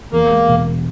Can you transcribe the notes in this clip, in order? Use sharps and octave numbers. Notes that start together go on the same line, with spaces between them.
E2 A#3
G#3
E1